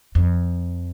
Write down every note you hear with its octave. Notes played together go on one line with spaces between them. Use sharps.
F2